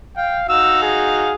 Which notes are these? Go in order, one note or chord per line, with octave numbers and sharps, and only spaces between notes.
F5 G5
D#4 F#4 F5 E6
G#4